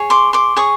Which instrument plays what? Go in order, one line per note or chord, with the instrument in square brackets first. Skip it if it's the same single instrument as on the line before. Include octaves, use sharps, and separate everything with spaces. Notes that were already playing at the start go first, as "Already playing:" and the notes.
Already playing: [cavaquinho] G#4 C#5
C6 D6
C6 D6
G#4 C#5 C#6 D#6